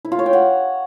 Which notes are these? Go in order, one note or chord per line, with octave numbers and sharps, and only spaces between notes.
E4
F4
C#5
G5
F#5